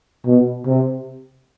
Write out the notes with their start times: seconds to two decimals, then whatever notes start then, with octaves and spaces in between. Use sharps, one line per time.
0.26 B2
0.66 C3